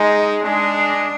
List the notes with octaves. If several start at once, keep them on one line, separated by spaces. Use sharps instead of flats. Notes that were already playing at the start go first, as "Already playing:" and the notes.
Already playing: G#3 D#4
G#3 D4